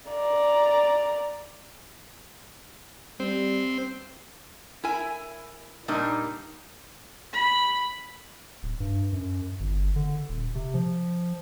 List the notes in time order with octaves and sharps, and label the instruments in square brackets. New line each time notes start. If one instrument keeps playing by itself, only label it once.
[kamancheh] D5 A#5
[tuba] G3 [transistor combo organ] C4
[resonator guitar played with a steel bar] E4 A#4 G#5
A#2 G3 A#3 D4 D#4
[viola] B5
[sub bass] D1
G2
F#2
G1
D3
D#1
C3
F3